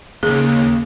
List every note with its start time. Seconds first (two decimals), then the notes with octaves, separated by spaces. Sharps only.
0.23 D#2 C#3 A#3 G#4